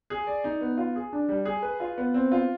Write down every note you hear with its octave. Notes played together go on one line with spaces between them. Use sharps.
G#4
D5
D#4
B3
F4
G#4
D4
G3
G#4
B4
F4
B3
C4
F4